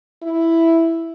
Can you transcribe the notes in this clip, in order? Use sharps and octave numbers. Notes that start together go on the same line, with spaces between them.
E4